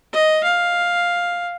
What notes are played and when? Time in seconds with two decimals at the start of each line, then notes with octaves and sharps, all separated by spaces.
0.13 D#5
0.44 F5